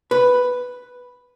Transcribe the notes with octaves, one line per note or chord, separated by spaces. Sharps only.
B4